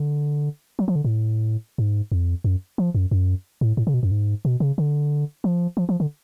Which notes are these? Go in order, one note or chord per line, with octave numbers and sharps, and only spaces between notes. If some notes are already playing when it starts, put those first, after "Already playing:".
Already playing: D3
F#3
F3
D3
A2
G#2
F2
F#2
F3
F#2
F#2
A2
A2
C#3
B2
F#2
G#2
B2
C#3
D3
F3
F3
F3
D3